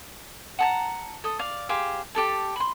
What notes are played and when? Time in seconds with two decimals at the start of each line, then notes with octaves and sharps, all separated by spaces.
0.59 F#5 A5 A#5
1.24 A4 D#6
1.39 D5 F5
1.69 G4 G#4 C5 F5
2.15 G4 A4 A5
2.56 B5 C6